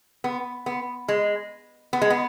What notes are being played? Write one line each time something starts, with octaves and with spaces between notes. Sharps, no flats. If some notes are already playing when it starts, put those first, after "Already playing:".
B3
B3
G#3
B3
G#3
B3